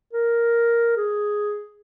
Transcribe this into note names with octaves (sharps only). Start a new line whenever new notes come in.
A#4
G#4